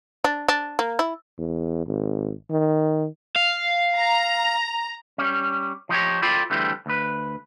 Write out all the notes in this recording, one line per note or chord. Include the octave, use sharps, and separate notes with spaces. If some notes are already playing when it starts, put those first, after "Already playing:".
D4
D4
A#3
E4
E2
G#1
D#3
F5
A#5
G3 C#4
F3 D#4 G4 C#5
F4 A4 C5 D5 G5 B5
D3 E3 G3 A3 C4
D2 B4